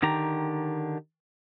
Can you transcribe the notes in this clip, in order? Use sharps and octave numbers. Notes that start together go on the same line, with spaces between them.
D3 D#3 G4 A#5